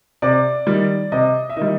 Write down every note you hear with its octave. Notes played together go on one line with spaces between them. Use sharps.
C3 D5
D#3 G3
C3 D#5
E5
D#3 G3 D#5